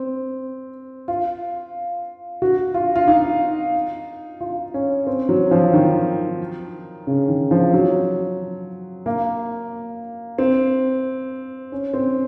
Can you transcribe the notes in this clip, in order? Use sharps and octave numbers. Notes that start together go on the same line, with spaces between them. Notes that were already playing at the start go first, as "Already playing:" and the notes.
Already playing: C4
F4
F#4
F4
F4
D#4
F4
C#4
C4
F#3
F3
D#3
C#3
D#3
F3
F#3
A#3
C4
C#4
C4